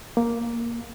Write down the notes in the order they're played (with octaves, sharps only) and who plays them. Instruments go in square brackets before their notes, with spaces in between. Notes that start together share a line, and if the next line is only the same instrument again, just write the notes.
[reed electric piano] A#3